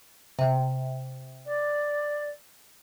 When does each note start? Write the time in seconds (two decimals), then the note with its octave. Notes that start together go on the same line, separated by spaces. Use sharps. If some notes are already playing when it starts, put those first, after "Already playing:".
0.39 C3
1.46 D5